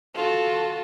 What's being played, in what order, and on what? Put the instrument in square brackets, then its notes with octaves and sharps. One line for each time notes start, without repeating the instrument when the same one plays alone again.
[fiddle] F4 F#4 [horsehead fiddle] A4 A5